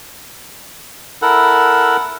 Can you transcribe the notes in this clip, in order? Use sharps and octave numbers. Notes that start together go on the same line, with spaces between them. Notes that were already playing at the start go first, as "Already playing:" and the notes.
E4 A4 A#4 F#5